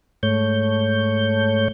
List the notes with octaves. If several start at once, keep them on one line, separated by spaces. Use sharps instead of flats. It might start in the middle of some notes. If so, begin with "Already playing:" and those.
G#2 A3 C#5 G6